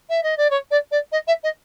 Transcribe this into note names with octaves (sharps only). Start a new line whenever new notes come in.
E5
D#5
D5
C#5
D5
D5
D#5
E5
D#5